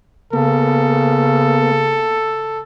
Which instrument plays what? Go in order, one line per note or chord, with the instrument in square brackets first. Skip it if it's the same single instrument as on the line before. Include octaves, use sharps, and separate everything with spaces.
[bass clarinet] C#3 [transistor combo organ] A#3 B3 [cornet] A4